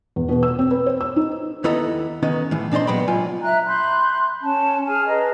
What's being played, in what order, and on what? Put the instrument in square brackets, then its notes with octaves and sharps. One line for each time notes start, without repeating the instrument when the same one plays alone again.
[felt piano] E2
B2
E6
C4
B4
C5
E6
D#4
[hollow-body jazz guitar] D#2 B3 E4 A4 D#5 A#5
D#3 B3 C#4 D#4
A2 E3
A#2 D4 D#4 C5 C6
A#2 F#3 B3 G5 B5
C#2 F#3 F4 G#5
[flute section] E5 A#5 F#6
B5 C6 F#6 G6
C#4 A5
G#4 G#5 F6
G#4 B4 D#5 A#5